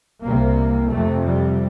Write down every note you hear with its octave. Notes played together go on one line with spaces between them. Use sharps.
C2 C3 A#3
F2 C3 A3
G3